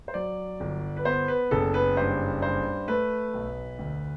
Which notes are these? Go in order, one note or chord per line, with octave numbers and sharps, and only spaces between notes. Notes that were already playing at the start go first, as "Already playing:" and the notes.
C5
F#3 D5
G1
B4
B3 C5
B4
F#1 A4
B4
G2 C5
G2 C5
A3 B4
B1
D2